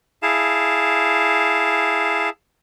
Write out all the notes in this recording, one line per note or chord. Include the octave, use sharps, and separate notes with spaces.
E4 G#4 F5 A5